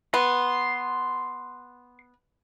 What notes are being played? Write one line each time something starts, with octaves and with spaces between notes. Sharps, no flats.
B3 C6